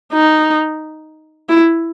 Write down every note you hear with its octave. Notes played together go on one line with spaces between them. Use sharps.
D#4
E4